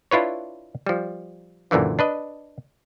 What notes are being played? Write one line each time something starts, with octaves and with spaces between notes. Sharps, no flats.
D4 E4 F4 B4 C#5
F3 G3
F#2 A#2 D3 E3 F3
D4 B4 D#5